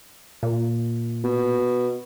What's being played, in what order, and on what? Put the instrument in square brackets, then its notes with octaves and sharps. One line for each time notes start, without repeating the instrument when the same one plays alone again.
[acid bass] A#2
[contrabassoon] B2